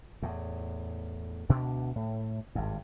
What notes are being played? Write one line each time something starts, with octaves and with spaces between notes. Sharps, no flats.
E2 A2
D2 B2 D4
A2
G#1 G2